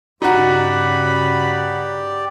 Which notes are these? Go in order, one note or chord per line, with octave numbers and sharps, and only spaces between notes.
G2 C#3 D#4 F#4 G4 D5 B5